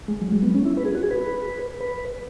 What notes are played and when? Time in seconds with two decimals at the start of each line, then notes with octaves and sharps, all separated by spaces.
0.08 G#3
0.22 F#3
0.32 G#3
0.42 B3
0.54 C#4
0.65 E4
0.77 B4
0.85 G#4
0.95 F#4
1.03 G#4
1.11 B4
1.81 B4